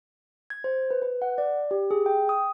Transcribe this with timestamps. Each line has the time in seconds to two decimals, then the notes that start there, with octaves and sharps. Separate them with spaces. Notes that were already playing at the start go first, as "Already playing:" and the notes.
0.50 G#6
0.64 C5
0.91 B4
1.02 B4
1.22 F#5
1.38 D5
1.71 G4
1.91 G#4
2.06 G5
2.29 D#6